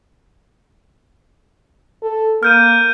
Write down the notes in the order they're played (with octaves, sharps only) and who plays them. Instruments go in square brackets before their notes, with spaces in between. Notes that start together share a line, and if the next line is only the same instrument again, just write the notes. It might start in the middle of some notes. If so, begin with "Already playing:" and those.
[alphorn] A4
[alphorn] A#3 [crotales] F6 G6 D#7